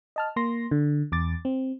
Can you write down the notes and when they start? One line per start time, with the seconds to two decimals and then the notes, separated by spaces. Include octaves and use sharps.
0.16 D#5 A5 F6
0.36 A#3 C6 A#6
0.71 D3
1.12 E2 D6 A6
1.45 C4